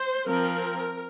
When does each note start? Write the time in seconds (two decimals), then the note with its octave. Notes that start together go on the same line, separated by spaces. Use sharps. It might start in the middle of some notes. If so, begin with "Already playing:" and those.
Already playing: C5
0.27 F3 C4 A#4